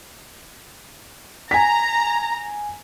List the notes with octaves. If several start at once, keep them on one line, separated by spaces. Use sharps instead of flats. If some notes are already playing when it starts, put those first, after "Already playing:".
G#5 A#5 B6